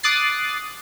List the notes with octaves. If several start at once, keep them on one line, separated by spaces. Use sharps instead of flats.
D6 D#6 F#6 A6 C7